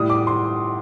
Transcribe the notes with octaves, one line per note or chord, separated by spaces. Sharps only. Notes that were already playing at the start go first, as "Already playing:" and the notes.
Already playing: A2 G3 D#6
D6
C6